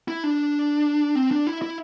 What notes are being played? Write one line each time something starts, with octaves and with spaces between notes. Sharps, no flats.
E4
D4
C4
D4
E4
E4